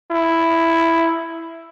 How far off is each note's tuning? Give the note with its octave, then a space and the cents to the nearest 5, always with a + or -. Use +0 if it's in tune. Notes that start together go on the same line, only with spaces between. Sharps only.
E4 +5